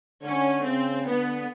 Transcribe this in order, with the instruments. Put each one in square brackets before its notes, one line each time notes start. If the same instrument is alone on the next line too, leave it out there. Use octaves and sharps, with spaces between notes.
[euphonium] D3 [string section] C#4
[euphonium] C#3 [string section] C4
[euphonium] D3 [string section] B3